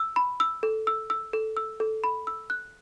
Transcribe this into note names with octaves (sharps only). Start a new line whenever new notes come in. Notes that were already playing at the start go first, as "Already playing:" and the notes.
Already playing: E6
B5
E6
A4
E6
E6
A4
E6
A4
B5
E6
F#6